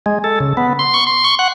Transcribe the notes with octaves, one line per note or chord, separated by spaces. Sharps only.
G#3
A4
C#3
B3
C6
C#6
C6
C#6
F#5